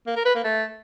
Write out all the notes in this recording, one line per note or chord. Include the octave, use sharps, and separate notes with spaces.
A#3
A#4
B4
A#3
A3